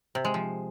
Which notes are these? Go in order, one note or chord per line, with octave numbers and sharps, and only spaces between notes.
C3
G#3
F3